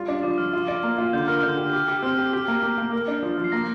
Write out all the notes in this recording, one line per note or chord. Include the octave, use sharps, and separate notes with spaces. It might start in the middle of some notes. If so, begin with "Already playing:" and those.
Already playing: G3 F4
D4
F3 D6
F3 F6
F4
D5
A#3
F4
D3 G6
A#4 F6
D3 G6
G4
G4
G4
C4 F6
G4
G4
A#3
A#3
A#3
A#4 F6
D4
F3
F3
C7
A#3 A#6